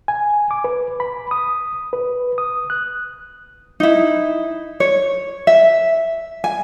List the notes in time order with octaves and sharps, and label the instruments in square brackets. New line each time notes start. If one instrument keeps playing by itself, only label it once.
[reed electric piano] G#5
D6
B4
B5
D#6
B4
D#6
F#6
[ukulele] D#4 E4
C#5
E5
G#5